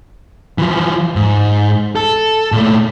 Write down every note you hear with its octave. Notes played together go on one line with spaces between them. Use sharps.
E3 F3
G#2
A4
A#2 A3